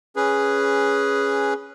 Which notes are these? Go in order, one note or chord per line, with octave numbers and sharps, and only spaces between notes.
C#4 G#4 B4